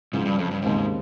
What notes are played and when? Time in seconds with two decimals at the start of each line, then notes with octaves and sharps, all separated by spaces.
0.13 C#2 G#2 C#3 F3
0.25 G2
0.39 F2
0.51 G2
0.62 D#2 G#2 C#3 G#3 C4